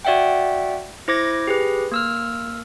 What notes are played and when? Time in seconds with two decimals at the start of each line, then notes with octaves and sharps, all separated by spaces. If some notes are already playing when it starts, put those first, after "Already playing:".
0.05 F#4 D5 E5 F#5 G5
1.08 E4 C5 D6 G#6 A#6
1.47 G4 G#4 B4
1.92 A#3 E6 F6